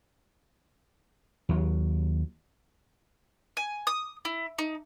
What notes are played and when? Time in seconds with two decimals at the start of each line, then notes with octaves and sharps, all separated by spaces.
1.49 D#2 F#3
3.57 G#5
3.87 D#6
4.25 E4
4.59 D#4